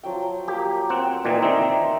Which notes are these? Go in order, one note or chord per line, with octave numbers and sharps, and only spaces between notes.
F3 F#3 G5
A#3 G4
C4 F#5
A#2 E3 D#4 A#4 D5
D#3 C4 E5